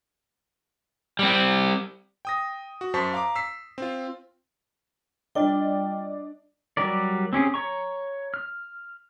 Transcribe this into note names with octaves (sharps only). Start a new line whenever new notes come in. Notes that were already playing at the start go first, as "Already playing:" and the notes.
G3 C4
G5 D#6 A#6
F#4
F#2 C5 A5 C#6 B6
F5 A#5 D6
E6 B6 C7
C4 F4
G3 D4 F4 D5 D#5 G5
F#3 G3 G4 A#4 D5
C4 C#4 G4 G#4
C#5 A#5 C#6
F6